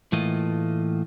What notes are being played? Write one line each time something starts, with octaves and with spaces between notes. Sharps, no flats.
A2 E3 A3 A#3 F4 D#5